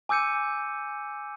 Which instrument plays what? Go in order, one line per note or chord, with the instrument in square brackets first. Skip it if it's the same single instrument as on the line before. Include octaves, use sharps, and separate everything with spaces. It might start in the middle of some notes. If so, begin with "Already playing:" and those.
[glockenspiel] G#5 D6 E6 G6 C#7 D#7